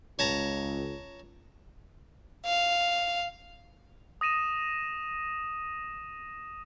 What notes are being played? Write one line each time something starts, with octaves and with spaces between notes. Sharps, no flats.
C#2 C#5 A5 A#5
F5
D#6 A#6 D#7 E7